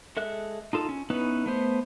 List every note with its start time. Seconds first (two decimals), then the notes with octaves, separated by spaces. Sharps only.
0.17 G#3 A4 E5 F#6
0.73 D#4 F4 A4
0.89 C#4
1.10 B3 C#4 D#4 E4 B4
1.46 A3 B3 C5